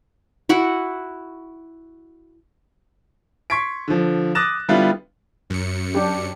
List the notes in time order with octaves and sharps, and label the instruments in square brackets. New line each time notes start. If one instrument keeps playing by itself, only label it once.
[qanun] E4 F#4 F#5
[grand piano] C6 C#6 G#6 B6 D7
D3 F3
D6 D#6 F#6 A6 A#6 E7
D3 G3 B3 E4 F4
[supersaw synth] F#2 C#7
[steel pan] D4 G4